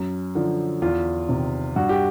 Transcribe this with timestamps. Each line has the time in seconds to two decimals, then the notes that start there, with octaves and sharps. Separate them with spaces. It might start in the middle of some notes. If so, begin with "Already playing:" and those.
Already playing: F#2
0.35 D3 F3
0.82 E2 F4
1.29 C3 D#3
1.76 G2 F#4
1.89 G4